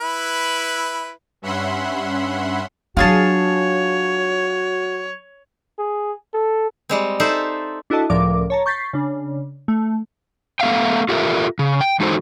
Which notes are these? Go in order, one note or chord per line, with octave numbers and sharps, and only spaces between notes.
E4 B4
G2 C#4 E5 F#5 B5 C6
F#3 D4 F4 F#4 G#4 C#5 A5
G#4
A4
G3 G#3 C4
D#4 A4 C5 D5 E5
D4 E4 F#4 A4 D#5 A5
C#2 A2 F3 A#4 D5 D6
C#5 A5 A#5
C#6 G6 A6 B6 C7
C#3 D4
A3
A3 B3 E5 F5 G5
F4 G4 A4 A#4 E5
C#3
G5
E3 G#3 D#4 F#4 A4 C5